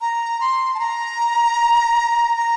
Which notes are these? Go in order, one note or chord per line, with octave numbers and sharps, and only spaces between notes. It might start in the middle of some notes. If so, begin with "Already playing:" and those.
A#5
C6
A5
A#5
A#5